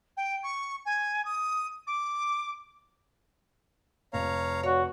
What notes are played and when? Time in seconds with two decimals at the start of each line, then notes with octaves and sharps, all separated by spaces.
0.17 G5
0.43 C#6
0.85 G#5
1.25 D#6
1.87 D6
4.13 F1 C#5 F5 A#5
4.63 F#4 C#5